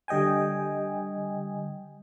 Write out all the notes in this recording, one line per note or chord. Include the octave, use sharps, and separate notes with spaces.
D3 G3 D#5 G5 G#5